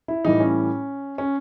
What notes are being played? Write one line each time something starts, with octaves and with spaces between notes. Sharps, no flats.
E4
A2 E3 G3 D#4
C#4
C#4